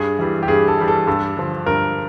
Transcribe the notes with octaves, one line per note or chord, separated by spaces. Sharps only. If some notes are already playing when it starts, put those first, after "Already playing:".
Already playing: G2 G#4
E3 G3
G4
G2 G#4
A4
E3 G3
A4
G2 A4
D3 F3
G2 A#4